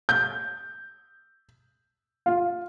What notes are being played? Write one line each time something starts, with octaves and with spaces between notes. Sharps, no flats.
G6
F4